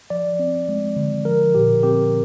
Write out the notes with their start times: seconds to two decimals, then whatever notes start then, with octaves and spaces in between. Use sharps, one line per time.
0.10 F3 D5
0.39 C4
0.69 G#3
0.96 D3
1.25 F3 A#4
1.55 A#2 G4
1.83 C4 G4